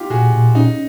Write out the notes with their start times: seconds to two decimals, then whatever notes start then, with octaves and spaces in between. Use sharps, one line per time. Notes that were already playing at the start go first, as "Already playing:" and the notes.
Already playing: D#4 F4 G4
0.10 A#2 F#4 G#4
0.32 A#2
0.55 C#4 D#4